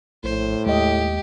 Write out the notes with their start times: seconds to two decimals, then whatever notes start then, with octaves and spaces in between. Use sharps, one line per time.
0.24 A#1 A2 C5
0.66 D#2 G#3 G4 D#5